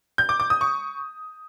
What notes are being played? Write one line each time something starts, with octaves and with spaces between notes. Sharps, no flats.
G6
D6
D6
D#6
C#6